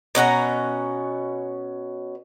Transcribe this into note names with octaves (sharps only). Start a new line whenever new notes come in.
B2 C#4 F#5 A#5